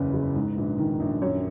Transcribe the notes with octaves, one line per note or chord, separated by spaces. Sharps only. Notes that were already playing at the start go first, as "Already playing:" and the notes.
Already playing: F#1 E2 C#3 B4
F#1
G#2
A#1
D#3
A#1
F#2 C#5